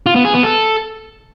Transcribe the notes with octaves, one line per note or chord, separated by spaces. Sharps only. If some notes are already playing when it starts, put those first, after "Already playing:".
F4
B3
G#4
B3
A4